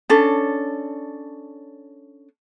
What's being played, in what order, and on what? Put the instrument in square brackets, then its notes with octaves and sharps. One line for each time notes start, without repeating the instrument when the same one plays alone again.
[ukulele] C#4 D4 A4